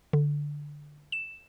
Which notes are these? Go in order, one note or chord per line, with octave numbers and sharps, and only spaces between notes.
D3
E7